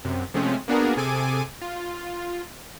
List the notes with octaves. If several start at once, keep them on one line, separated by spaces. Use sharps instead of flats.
F#2 C3
C3 F3 G#3 A3 C4 C#4
A#3 B3 D4 F#4 G#4 A#4
C3 G#4 A4 G#5 D6 D#7
F4